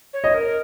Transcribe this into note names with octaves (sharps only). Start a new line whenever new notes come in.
C#5
D#5
A#4